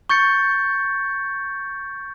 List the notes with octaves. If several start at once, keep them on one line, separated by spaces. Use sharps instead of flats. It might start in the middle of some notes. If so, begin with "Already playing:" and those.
C#6 G6 A6 C#7